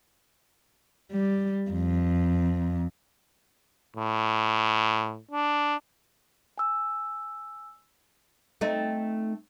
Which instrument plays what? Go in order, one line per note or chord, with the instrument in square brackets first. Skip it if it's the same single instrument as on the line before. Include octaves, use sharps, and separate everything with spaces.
[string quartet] G3
F2
[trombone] A2
D4
[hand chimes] G#5 E6
[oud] A3 C4 D#4